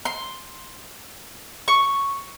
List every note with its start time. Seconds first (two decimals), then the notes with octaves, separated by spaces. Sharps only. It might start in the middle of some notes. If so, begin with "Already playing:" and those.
0.05 C6
1.68 C#6